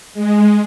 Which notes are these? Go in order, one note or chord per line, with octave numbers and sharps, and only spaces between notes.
G#3